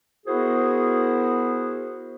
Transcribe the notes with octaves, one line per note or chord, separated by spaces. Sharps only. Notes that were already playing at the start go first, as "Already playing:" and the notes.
B3 E4 F#4 G#4 A#4 C5